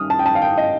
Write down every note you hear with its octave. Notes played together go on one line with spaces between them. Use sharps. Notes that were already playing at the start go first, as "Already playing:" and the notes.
Already playing: D#3 G3 D#6 F6
A5
G5
A5
F5
G5
D#5